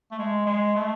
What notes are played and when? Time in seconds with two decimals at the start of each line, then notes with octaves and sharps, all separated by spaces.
0.11 A3
0.19 G#3
0.46 G#3
0.75 A3